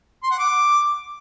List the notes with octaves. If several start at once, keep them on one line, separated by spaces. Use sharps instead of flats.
C6
F#5
D6